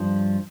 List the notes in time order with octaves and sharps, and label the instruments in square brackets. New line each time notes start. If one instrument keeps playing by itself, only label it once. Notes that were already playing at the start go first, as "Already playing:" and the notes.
Already playing: [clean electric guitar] G2 F3